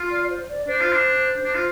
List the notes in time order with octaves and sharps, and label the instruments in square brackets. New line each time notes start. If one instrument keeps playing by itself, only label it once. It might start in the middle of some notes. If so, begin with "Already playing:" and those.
Already playing: [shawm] F4
[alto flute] D5
D5
C5
D5
[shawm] D4 [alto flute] C5
[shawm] F4
D4
D4
F4